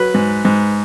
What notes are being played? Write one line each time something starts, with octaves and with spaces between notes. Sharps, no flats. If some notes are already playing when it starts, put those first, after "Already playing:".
Already playing: F#3 B4
G#2
G#2